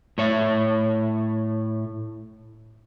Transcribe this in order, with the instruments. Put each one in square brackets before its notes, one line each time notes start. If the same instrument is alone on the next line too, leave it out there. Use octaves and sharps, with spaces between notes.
[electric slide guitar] A2 C#5 E5